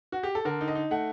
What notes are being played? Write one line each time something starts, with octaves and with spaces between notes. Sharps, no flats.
F#4
G4
A4
D3 A#4
D#4
D#5
D#4
A3 F#5